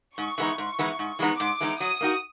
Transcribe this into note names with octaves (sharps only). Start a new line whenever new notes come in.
G#2 C#6
E3 G#3 B3 D#4
G#2
E3 G#3 B3 D#4
G#2
E3 G#3 B3 D#4
G#2 D6
E3 G#3 B3 D#4
F#3 D#6
A#3 D#4 F#4